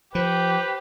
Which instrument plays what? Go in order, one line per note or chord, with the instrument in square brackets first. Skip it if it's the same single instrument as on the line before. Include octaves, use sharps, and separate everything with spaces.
[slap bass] F3 [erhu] G4 [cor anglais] B4 [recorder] C5